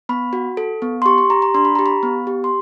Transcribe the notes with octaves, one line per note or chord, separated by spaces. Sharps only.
B3 B5
F#4
A4
B3
C6
G4 C#6
C6
G4 A#5
A#5
D4 C6
B5
G4 A#5
B5
B3
G4
C6